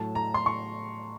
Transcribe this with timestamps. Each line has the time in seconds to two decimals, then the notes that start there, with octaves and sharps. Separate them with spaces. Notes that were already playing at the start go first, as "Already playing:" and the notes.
Already playing: A2 F#3 A5
0.15 A#5
0.34 C6
0.46 C#6